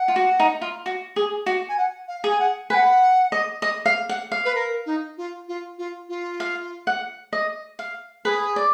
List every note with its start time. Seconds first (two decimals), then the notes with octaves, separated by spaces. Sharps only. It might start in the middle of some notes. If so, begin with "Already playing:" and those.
Already playing: F#5
0.08 F4
0.16 F#4
0.40 D#4
0.61 F4
0.86 F#4
1.16 G#4
1.46 F#4
1.69 G#5
1.78 F#5
2.08 F5
2.24 G#4
2.30 G#5
2.39 F#5
2.70 B4 G#5
2.74 F#5
3.32 D#5
3.62 D#5
3.86 F5
4.09 F#5
4.32 F5
4.45 B4
4.55 A#4
4.86 D#4
5.18 F4
5.48 F4
5.78 F4
6.09 F4
6.40 F5
6.87 F#5
7.33 D#5
7.79 F5
8.25 G#4 B4
8.56 D5